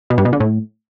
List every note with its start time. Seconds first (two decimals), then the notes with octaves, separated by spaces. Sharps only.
0.10 B2
0.18 G2
0.25 B2
0.33 D3
0.40 A2